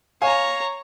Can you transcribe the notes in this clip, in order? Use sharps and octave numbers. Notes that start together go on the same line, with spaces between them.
C#5 F5 G#5 A#5